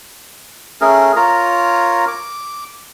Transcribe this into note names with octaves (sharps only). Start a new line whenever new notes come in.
A3 C#4 G#4 A#4
F4 A#4 C#5 A#5
D6